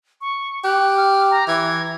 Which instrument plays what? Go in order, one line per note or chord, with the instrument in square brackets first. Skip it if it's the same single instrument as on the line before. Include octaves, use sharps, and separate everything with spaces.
[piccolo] C#6
[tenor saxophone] G4 [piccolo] F#6
[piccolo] F6
A#5
[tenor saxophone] E3 [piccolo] G#6